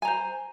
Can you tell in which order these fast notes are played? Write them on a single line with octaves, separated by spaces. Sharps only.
G#5 A#5 C5